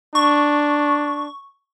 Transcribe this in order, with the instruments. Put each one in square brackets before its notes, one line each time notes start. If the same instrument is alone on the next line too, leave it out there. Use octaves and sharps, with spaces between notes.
[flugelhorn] D4 [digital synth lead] C#6